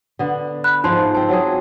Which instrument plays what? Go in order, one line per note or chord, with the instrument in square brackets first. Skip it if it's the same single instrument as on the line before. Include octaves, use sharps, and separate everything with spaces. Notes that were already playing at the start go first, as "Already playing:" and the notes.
[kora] D3 B3
[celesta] B5 F#6
[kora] G#2 F3 F4 [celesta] D#4 A5 C6
[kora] C4 F4 [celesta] A5
[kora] F#3 F4 G#4